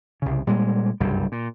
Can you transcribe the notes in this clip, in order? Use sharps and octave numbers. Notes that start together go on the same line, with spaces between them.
C2 C#3
A#2 G3 G#3
F#1 C2 G2 G3
A#2